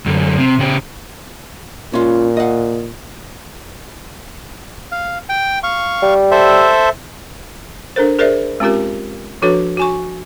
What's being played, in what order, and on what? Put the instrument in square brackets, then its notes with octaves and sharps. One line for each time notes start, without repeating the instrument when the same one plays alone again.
[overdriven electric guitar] F#2 D3
C3
C#3 G4
[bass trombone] A#2 [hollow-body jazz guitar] C#4 F4
[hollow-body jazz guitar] D#5 F#5
[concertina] F5
G5
F5 C#6
[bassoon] G3
[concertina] A4 C5 E5
[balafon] D4 A4 A#4 C5
G#4 A#4 C5 D5 E5
G#3 C4 C#4 F4 G4 A#4
F3 D4 F#4 A4 B4 C#5
F#4 G#5 C#6